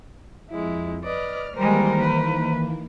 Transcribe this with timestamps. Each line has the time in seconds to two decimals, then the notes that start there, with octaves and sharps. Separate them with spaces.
0.50 F2 G#3 E4
1.04 B4 D5 D#5 F6
1.56 D#3 E3 G3 G#3 A#3 A#4 C5
2.01 B4